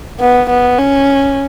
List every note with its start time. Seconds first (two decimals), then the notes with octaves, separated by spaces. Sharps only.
0.20 B3
0.49 B3
0.78 C#4